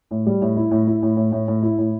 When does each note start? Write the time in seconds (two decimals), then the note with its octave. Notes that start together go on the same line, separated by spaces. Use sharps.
0.11 A2
0.26 G3
0.42 A2
0.57 E4
0.71 A2
0.87 E4
1.02 A2
1.17 A2
1.32 A2
1.48 A2
1.63 E4
1.78 A2